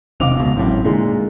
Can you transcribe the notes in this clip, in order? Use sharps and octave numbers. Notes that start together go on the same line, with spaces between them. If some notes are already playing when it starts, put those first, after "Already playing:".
E1 C3 D#3 F5 D6 F7
C#2 B2
G#1 F#2 A2 C4
A#2 D3 G#3 D#4